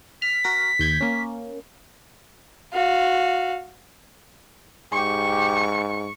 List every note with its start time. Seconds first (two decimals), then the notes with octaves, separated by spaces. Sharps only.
0.22 F6 B6
0.44 F#4 A#4 A#6
0.79 D#2 G6 G#6
1.01 A#3 C#4
2.74 F#4 F5
4.93 G#2 G4 C#6